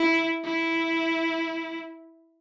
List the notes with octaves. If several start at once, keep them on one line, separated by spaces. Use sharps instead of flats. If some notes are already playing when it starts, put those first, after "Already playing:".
Already playing: E4
E4